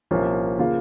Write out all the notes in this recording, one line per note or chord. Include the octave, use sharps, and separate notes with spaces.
C2 A#2 F3 A#3 C#4
C#3 F3 A#3 F4